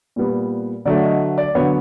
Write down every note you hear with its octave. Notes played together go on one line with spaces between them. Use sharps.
A#2 G3 B3
D3 F#3 A3 D5
D#5
D5
D3 F#3 B3 C#5